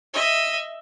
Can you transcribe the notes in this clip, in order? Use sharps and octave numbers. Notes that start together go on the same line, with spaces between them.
D#5 E5